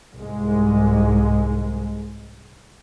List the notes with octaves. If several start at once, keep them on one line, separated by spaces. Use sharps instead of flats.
C2 G#2 G#3